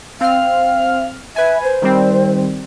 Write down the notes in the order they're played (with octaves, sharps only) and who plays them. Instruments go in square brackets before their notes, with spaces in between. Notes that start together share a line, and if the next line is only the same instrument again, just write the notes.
[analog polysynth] C4 F6 [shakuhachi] F5
[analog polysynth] B4 G#5 [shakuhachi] E5
[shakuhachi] C5
[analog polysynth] D#3 G3 C4